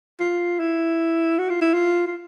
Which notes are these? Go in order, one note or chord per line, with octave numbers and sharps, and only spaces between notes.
F4
E4
F#4
F4
E4
F4
F4